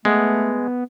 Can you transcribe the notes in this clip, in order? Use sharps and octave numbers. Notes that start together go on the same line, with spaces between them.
G#3 A3 B3